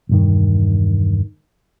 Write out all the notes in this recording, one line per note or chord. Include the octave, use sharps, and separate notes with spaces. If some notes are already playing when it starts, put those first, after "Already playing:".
E1 G2 D#3